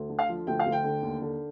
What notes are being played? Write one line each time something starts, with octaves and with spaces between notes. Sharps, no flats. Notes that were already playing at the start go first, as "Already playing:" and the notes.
Already playing: D2
D3
F5
F3
D2 G5
F5
D2
G5
D3
D#2
D3